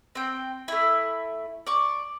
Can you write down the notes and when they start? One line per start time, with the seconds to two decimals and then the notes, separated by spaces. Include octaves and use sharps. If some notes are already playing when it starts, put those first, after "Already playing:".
0.15 C4 G5
0.68 A3 E4
1.67 D5 C#6